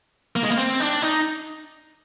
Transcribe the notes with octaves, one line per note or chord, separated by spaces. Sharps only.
A#3
G#3
A#3
C4
D4
D#4